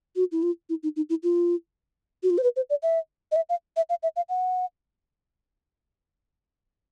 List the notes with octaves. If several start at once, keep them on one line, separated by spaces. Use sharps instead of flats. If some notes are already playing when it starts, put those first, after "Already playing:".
F#4
E4
F4
E4
D#4
D#4
E4
F4
F#4
F4
C5
B4
C5
D5
E5
D#5
E5
F5
E5
F5
E5
F5
F#5